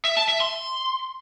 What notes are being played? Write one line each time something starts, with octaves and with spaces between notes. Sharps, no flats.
E5
A5
E5
C6